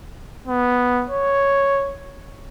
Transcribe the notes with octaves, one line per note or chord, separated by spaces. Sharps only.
B3
C#5